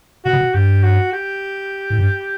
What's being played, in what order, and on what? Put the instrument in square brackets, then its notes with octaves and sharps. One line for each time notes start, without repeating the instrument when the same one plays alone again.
[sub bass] B2 [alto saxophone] F#4
[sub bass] C3
B2
[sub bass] G2 [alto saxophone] G4
[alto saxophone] F#4
G4
[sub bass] A2
G2